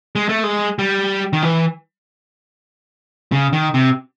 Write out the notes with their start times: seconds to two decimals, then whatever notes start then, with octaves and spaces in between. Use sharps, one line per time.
0.16 G#3
0.29 A3
0.44 G#3
0.79 G3
1.33 D#3
1.42 E3
3.32 C#3
3.53 D#3
3.74 C3